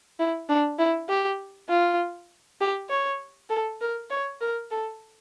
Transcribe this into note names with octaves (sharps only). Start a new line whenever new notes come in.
E4
D4
E4
G4
F4
G4
C#5
A4
A#4
C#5
A#4
A4